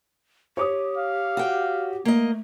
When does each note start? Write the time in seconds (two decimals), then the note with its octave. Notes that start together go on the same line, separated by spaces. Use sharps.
0.57 G4 C#5 D6 D#6
0.97 F5
1.37 F#4 G5
2.05 A3 A#3 D#5